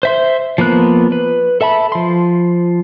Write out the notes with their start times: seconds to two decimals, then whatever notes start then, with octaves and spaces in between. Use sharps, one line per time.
0.03 C5 E5 C6
0.58 F3 A#3 B3 F#6
1.12 B4
1.61 A4 E5 A5 B5
1.92 F3 C6